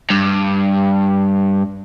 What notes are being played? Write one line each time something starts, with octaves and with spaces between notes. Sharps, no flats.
G2